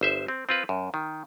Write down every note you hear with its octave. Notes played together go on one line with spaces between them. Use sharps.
G1 C5 E5
C4
C4 F4 B4
F#2
D#3